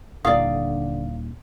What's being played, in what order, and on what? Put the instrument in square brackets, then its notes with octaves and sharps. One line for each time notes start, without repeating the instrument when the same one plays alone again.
[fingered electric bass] D#1 [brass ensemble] D3 [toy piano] E4 F#5 D#6 [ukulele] D5 F5